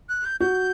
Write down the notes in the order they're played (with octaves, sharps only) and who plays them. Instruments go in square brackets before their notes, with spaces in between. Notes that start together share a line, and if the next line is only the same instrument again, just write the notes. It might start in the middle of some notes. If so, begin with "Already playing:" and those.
[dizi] F#6
G6
[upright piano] F#4 [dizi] G6